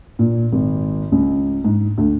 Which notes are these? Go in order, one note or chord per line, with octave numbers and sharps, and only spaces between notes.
A#2
G#1
C#2
G#2
D2